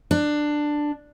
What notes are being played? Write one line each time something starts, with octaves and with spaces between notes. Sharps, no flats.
D4